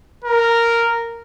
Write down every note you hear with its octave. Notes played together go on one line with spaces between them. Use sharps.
A#4